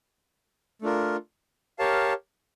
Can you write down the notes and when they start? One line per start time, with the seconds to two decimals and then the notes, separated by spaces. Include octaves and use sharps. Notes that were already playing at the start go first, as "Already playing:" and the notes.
0.82 A3 D4 F4 A#4
1.79 G4 A#4 C#5 F5 A5